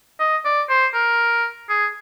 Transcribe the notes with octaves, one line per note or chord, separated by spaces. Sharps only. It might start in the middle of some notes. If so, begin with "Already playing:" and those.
D#5
D5
C5
A#4
G#4